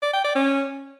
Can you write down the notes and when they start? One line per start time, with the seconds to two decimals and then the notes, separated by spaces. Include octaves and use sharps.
0.02 D5
0.14 G5
0.25 D5
0.36 C#4